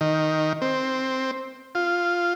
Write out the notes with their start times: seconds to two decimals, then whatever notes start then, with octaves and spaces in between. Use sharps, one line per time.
0.01 D#3
0.62 C4
1.75 F4